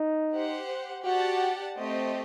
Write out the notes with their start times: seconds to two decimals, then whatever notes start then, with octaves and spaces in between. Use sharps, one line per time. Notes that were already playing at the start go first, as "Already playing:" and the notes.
Already playing: D#4
0.33 G4 C5 F#5
1.05 F#4 G4 D5 F#5 A5
1.77 A3 C4 G4 C5 D#5